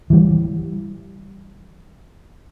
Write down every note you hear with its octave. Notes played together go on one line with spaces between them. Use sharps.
E3 G3